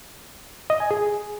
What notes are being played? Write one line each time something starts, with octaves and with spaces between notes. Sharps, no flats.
D#5
G#5
G#4